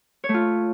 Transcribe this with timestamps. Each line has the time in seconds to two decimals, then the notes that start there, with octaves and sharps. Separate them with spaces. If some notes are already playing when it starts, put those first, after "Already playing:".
0.24 C#5
0.29 A3
0.34 F4